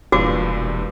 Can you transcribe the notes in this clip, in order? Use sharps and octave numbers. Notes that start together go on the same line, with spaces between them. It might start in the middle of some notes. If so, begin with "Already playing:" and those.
E1 G2 A#2 E3 F#4 D6